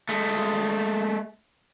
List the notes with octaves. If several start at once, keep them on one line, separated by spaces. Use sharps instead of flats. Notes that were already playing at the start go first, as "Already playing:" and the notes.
G#3 A3